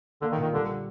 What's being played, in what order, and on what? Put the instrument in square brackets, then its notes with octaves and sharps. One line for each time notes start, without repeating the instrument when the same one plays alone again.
[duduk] D3 [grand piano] A#3
[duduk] D#3
[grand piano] A#2
[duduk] D#3
[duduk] D3 [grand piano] G3